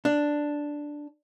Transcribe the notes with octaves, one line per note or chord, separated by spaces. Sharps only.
D4